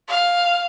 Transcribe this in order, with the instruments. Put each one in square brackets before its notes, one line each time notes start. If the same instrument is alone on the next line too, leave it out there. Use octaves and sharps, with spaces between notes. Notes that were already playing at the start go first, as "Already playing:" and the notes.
[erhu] F5